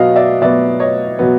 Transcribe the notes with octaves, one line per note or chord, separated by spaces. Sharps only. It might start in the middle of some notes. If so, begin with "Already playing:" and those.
Already playing: B2 F#3 B3 D#5 F5
D5 E5
B2 F#3 B3 D5 E5
C#5 D#5
B2 F#3 B3